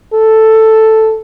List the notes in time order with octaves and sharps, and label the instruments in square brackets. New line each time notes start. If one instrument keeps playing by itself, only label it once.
[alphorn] A4